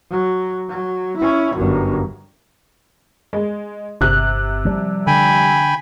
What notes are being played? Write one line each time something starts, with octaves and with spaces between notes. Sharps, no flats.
F#3
F#3
C#4 E4
G1 F#2
G#3
G1 C3 F#6
F3 G3
D3 G5 G#5 B5